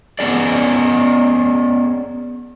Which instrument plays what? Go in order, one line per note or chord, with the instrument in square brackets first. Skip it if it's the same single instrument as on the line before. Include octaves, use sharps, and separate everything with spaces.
[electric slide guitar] B3 C#4 G#4 D5